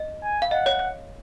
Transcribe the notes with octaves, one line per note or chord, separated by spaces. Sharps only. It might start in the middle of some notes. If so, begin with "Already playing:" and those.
Already playing: D#5
G#5
F5
D#5 F#5
C#5
C#5